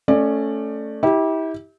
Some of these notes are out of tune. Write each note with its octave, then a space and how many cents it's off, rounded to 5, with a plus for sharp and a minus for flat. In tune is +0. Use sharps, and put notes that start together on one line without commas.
A3 +0 C#4 +0 D5 +20
E4 -35 G4 +0